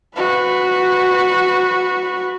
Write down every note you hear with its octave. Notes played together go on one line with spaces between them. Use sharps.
F#4 B4